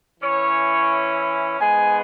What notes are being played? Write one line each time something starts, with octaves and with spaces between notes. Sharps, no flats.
E3 C#4 E4 C#5
G#2 G#3 B3 G#5